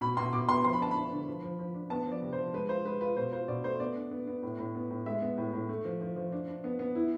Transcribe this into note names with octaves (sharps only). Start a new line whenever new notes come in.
B2 B5
B2 C6
B2 D6
B3 C6
F3 C6
B5
D4 A5
D4 B5
D3
F3
F3
F3
D4
B3 A5
F3
D5
C3
C5
F3
G#3 B4
F4 C5
G#3 B4
F4 B4
B2 C5
F4 C5
B2 D5
A3 C5
B3 D5
D4
B3
B3
A2
A2
B3
A2
G#3 E5
B3
A2
A2
A3
F3
F3
F3
D4
D4
B3
B3
E4